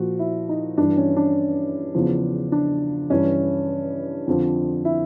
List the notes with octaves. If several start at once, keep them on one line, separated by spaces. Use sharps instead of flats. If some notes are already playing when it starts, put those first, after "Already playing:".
Already playing: A#2 F3 F#4
E4
D#4
G2 E3 D4
C#4
D4
E2 C#3 F3
D4
G2 E3 C#4
F2 D3 F3
E4